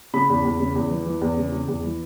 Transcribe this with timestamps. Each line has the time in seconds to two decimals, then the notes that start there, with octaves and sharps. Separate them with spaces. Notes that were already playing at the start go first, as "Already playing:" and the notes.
0.14 C#3 B5
0.30 E2
0.44 E2
0.60 C#3
0.75 E2
0.91 E3
1.06 E3
1.21 E2
1.37 C#3
1.52 C#3
1.68 E2
1.84 E3